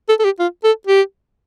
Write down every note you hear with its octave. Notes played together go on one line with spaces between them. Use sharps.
A4
A4
G4
F4
A4
G4